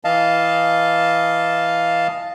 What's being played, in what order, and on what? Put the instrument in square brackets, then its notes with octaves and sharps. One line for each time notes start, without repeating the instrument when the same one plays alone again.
[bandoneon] E3 D#5 F5 A5